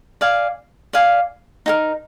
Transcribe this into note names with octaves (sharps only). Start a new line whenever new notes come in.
D5 F5 G#5
D5 F5 G#5
D#4 G4 A#4